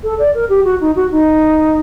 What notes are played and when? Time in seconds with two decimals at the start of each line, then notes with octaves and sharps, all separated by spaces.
0.03 A4
0.19 D5
0.34 A#4
0.49 G4
0.65 F#4
0.80 D#4
0.96 F#4
1.11 D#4